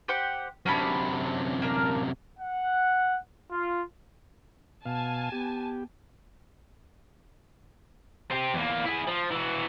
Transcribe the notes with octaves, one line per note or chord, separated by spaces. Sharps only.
G4 C5 F#5
F#2 C3 C#4 D4 B5
A#3 D4 A#4
F#5
F4
B2 F5 G#5 A5
B3 G4
C4 G4
E2 A#3
E4 G#4
F3
E3 F#4